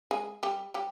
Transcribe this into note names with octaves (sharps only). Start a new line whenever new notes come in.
G#3 G#4
G3 G4
G3 G4